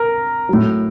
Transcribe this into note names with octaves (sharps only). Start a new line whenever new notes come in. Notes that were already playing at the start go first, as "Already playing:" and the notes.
Already playing: A#4
A2 F#3